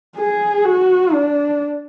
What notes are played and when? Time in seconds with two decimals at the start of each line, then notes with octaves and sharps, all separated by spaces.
0.17 G#4
0.65 F#4
1.13 D4